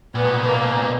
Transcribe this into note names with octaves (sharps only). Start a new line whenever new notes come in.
A#2 B3
B2
A#2
B2 A#3
A#2
B2
A#2
B2